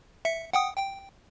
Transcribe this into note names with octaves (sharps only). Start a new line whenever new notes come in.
E5 C#7
F#5 G5 D#6
G5